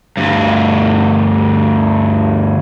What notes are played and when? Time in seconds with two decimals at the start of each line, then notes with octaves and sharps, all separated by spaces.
0.17 D2 G2